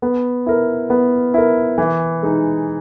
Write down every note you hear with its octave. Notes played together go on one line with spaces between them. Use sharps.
B3
E4 A#4
B3
E4 A#4
E3
G#3 D#4